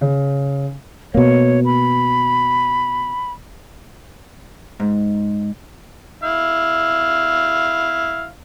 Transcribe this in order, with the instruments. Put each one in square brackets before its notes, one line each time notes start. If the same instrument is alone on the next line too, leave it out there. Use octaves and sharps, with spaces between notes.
[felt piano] C#3
[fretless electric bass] B2 A#3 [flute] C#5
[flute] B5
[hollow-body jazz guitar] G#2
[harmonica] E4 F5